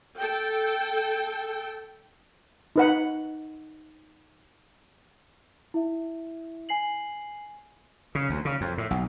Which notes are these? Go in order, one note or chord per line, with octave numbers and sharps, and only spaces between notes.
A4 G5
D#4 B4 F#5
E4 E5
G#5 C7 F#7
C#3
D2
C#3
F2
A2
B1